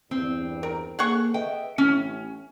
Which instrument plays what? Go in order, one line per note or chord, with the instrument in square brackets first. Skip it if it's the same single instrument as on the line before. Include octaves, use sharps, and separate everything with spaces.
[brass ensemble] E2 G2 [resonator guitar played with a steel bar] C4
[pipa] A#4
[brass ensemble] A#3 A4 [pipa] G#4 F#5 C#6
[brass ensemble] B4 D#5 E5 [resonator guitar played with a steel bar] G5
[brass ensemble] A1 A2 [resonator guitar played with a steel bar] C#4